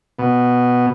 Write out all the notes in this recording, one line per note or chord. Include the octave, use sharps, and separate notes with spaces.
B2